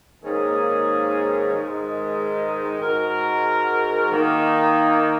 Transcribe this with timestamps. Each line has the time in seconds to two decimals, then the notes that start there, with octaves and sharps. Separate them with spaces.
0.23 G#2 D#3 A#3 C#4 G#4
1.52 G#2 D#3 G#3 D#4
2.81 G#2 G#3 F#4 A#4
4.10 D#3 A#3 D#4